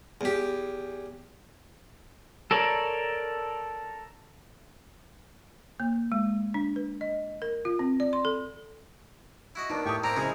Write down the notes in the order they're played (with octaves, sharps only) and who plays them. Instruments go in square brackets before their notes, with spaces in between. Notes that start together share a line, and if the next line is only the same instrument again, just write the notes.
[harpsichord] E2 G4
[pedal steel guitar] A4 A#4 C#5 D5
[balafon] A#3
G#3
D4
B4
D#5
A#4
F4
C4
D5
C6
A4
[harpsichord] E4 F#4 D#5
[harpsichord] D#2 B2 [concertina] D4 [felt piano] D#4
[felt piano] A2 A5 D#6 [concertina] G4 G5 C#6
[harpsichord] A#2 C4 E4 [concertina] G5 [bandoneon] A#5
[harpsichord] G#2 F3 G#3 [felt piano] C#3 [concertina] E4 G#4 G#5